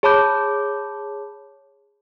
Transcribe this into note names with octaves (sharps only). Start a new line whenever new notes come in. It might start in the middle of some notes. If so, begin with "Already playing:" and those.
G#4 C#5 A5 B5 D6 G6